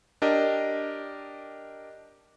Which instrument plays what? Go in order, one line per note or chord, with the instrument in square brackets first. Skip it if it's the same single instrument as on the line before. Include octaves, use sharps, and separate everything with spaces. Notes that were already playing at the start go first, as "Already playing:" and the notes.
[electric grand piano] D4 G4 A#4 D#5